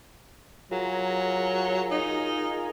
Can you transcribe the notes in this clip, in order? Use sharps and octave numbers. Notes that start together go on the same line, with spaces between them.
F#3 F4 G#4 A#4
D#4